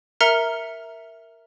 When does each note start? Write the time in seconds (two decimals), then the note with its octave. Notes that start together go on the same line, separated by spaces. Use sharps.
0.21 A#4 E5 A#5 F6 C#7